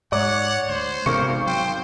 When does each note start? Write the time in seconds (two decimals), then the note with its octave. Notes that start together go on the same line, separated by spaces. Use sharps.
0.12 G#2 G#3 C#5 D5 F#5 D6
0.68 D2 C5
1.06 G#1 C3 B3 C#4 A#4 C#6 C#7
1.46 F#3 C5 G5